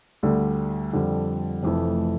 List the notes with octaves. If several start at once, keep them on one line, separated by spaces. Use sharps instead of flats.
D2 D3 G3
F2 D3 G3
F1 F2 E3 A3